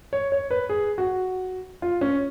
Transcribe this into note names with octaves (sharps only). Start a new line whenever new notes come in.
C#5
C#5
B4
G#4
F#4
F4
C#4